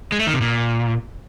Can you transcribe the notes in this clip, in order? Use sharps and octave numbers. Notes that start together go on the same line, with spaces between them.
G#3
A3
D#3
C3
A#2